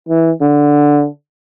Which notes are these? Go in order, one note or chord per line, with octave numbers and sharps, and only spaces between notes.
E3
D3